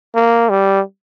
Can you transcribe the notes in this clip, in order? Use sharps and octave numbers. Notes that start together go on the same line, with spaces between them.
A#3
G3